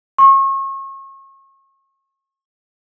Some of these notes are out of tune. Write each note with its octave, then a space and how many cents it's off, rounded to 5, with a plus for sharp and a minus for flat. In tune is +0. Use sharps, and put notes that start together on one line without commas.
C#6 -35